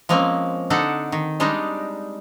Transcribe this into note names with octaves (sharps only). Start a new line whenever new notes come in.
F3 G#3 A#3 C4 C#4
D3 D4 D#4 A4 F#5
D#3
G3 G#3 D4 D#4